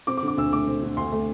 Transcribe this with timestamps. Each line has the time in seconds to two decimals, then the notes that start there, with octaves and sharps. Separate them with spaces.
0.07 C4 D6
0.17 D6
0.23 D3
0.28 D6
0.37 D2 E6
0.53 A3 D6
0.67 C4
0.83 D3
0.97 D2 C6
1.12 A3